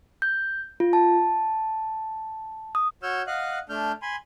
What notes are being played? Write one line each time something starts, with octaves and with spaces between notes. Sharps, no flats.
G6
F4
A5
D#6
F#4 C#5 E6 F6 G6
D#5 F5 F#5 F#6
A3 D4 F6 G6
G#5 B5 C6